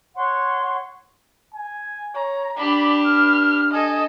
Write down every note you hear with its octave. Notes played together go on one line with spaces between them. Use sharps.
C#5 F#5 C6 C#6
G#5
C#5 A#5
D4 G4 D5 B5
B4 F6
A4 D#5 G#5